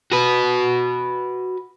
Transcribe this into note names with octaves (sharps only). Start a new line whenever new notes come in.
F#4 B4